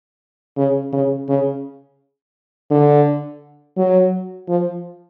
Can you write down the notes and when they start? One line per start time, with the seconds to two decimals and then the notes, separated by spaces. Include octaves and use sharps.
0.57 C#3
0.93 C#3
1.28 C#3
2.70 D3
3.77 F#3
4.48 F3